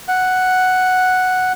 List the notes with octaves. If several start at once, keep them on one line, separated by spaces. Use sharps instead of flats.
F#5